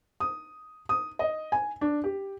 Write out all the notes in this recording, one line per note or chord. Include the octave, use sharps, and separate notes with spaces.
D#6
D#6
D#5
G#5
D4
G4